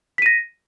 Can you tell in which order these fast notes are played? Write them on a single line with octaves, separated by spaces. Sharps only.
B6 D#7 A#6